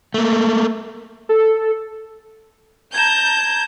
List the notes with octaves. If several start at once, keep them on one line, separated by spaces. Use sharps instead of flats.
A3 A#3
A4
A5 A#5 G6 G#6 E7